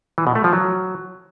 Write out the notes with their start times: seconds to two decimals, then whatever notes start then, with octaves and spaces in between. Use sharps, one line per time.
0.18 E3
0.27 B2
0.35 A3
0.44 F3
0.53 F#3